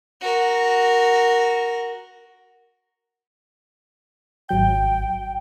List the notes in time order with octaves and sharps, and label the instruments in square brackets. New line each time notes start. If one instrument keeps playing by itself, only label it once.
[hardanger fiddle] F#4 A#4
[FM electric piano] G#1 F#3 G6 [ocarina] G5